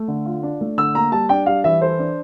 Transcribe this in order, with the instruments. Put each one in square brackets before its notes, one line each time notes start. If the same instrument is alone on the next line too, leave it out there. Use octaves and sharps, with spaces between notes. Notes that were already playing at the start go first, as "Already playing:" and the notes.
Already playing: [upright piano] A3
D3
F4
D4
A3
[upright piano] D3 [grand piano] E6
[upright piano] A#3 [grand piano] A#5
[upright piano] G3 [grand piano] A5
[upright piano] D4 [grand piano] G5
[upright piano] G3 [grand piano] F5
[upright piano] E3 [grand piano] E5
[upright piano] A4 [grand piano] C5
[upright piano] D4